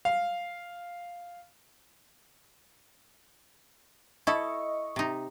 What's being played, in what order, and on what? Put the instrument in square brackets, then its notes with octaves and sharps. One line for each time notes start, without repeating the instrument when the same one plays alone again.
[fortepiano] F5
[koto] E4 A4 [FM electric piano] D#5 C#6
[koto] C3 D#4